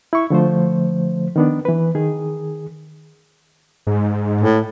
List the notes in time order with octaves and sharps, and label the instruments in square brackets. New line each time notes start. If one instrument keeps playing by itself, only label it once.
[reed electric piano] E4 C#6
D3 F3 A3 C5
D#3 B3 D4
E3 B4
D#3 G#4
[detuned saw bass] G#2
[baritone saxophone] A2